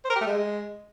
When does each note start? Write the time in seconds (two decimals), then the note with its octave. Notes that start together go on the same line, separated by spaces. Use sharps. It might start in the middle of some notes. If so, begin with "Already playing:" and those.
0.05 C5
0.10 A#4
0.15 G4
0.21 A3
0.26 G#3